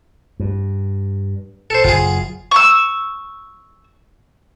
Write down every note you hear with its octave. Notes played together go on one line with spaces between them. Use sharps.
G2
A4 C5
F#1 F4 G#4
C#6 E6